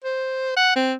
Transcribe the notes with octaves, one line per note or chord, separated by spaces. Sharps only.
C5
F#5
C4